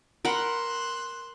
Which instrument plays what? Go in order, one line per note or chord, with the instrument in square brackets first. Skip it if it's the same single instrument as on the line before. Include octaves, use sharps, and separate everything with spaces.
[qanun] A#4 F#5 B5 [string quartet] C6 E6 F#6